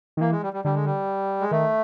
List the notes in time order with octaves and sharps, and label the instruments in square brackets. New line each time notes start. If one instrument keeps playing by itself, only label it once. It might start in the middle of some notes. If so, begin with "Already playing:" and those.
[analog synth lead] D#3
[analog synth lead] E3 [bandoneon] A#3
[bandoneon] G#3
G3
G3
[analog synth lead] D3 [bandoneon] G3
[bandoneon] G#3
G3
G#3
[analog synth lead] D#3 [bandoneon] A3